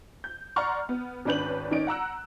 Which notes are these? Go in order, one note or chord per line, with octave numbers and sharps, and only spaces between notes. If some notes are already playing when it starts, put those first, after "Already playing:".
G6
D5 F#5 A#5 C6 C#6 F6
B3
G#1 C#4 D4 B4 G6 F#7
D#3 C#4 D#4 D5 D7
F#5 A#5 E6 F#6